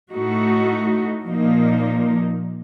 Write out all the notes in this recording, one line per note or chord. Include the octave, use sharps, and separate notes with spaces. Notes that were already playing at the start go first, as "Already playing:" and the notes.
A2 A3 D#4 F#4
A#2 F3 A#3 D#4